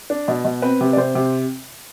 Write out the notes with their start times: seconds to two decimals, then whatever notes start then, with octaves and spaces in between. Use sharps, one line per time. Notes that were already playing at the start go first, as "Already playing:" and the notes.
0.10 D4
0.28 B2
0.45 B2
0.62 C4 B4
0.81 C3
0.93 D5
0.97 C3 C5
1.15 C3